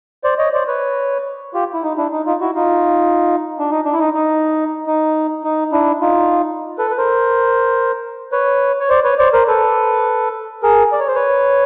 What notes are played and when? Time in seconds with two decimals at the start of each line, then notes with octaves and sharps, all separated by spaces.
0.24 C5 D5
0.39 C#5 D#5
0.53 C5 D5
0.67 B4 C#5
1.54 F4 G4
1.73 E4
1.83 D#4
1.97 D4 E4
2.12 D#4
2.26 D#4 F4
2.40 E4 F#4
2.55 D#4 F4
3.59 D4
3.70 D#4
3.85 D4
3.93 E4
3.99 D#4
4.14 D#4
4.86 D#4
5.44 D#4
5.72 D4 E4
6.01 D#4 F4
6.78 A4 B4
6.91 B4
6.98 A#4 C5
8.32 B4 C#5
8.80 C#5
8.89 C5 D5
9.04 B4 C#5
9.18 C5 D5
9.33 A#4 C5
9.48 A4 B4
10.63 G#4 A#4
10.92 D5
11.00 C#5
11.08 C5
11.15 B4 C#5